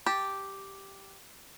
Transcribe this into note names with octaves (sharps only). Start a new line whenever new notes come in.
G4 A5